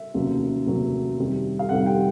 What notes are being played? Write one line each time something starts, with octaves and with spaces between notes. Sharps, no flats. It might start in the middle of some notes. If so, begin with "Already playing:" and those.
Already playing: E5
F1 D#2 C#3 F#3
F1 D#2 C#3 F#3
F2 C3 D#3 G3
F5
F2 C3 D#3 G3 F#5
G5